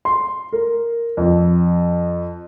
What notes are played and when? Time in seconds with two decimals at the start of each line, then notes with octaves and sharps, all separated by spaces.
0.05 C6
0.53 A#4
1.17 F2